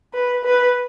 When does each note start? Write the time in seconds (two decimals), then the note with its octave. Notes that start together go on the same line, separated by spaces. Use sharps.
0.14 B4
0.44 B4